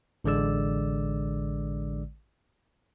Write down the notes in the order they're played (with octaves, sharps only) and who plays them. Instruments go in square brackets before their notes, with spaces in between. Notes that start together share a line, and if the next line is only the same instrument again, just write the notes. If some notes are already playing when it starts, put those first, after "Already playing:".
[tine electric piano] A1 D3 G#3 D5 E6